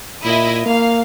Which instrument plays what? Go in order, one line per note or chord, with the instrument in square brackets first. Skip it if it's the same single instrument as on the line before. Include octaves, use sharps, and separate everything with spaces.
[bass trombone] A#2 [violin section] E4 D#5 D#6
[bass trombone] A#3 [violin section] F5